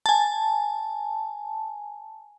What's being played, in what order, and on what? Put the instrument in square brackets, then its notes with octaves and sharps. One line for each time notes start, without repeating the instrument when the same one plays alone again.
[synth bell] G#5 A5